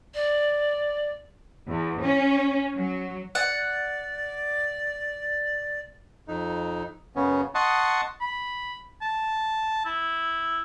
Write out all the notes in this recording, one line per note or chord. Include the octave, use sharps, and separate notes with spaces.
D5
E2
C#4
F#3
D5 F#5
F2 D#4
F#2 C#3 B3 C#4
D#5 F#5 A5 C6 C#6 D#6
B5
A5
E4